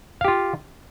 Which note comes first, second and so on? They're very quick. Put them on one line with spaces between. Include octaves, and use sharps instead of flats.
F5 G4 F4